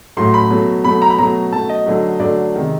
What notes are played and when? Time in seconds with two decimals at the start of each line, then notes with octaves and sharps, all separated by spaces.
0.17 A2 F#3 A3 C6
0.34 B5
0.50 B2 F#3 A3
0.84 B2 F#3 A3 B5
1.02 A#5
1.10 B5
1.18 B2 F#3 A3 A#5
1.53 B2 F#3 A3 A5
1.69 D#5
1.86 D3 F#3 A3
2.20 D3 F#3 A3 D5
2.54 C3 D#3 G#3